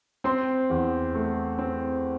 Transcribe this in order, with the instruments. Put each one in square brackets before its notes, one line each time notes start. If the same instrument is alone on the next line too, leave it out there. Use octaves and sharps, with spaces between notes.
[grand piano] C4 C6
E2
A3
C4